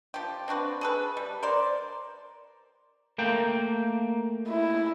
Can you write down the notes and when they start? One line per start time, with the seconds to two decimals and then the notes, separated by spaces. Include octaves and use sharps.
0.14 F3 G4
0.48 C4 D4 F#4 B4
0.81 G#4 A4 B4
1.17 G3
1.43 A#4 C5 D5
3.18 A3 A#3 G5
4.48 E4